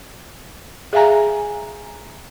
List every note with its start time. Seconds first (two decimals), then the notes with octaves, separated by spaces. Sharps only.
0.93 G#4 E5 F5 G#5 A#5